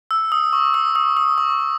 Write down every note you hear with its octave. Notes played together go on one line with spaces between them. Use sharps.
E6
D#6
C#6
D#6
D#6
D#6
C#6